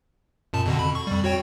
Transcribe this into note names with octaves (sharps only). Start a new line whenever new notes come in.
F#2 A#2 A5
F2 B2 D3
B5
C#6
F2 G3
F#4 C#5 G5